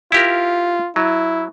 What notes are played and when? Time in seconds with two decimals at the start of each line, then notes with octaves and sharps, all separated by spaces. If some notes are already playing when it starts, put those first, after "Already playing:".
0.12 E4 F4 G4 A#4
0.96 F#3 E4